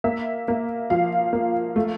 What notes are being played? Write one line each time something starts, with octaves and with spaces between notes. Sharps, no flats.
A#3 E5
A#3
F3 F5
A#3
A3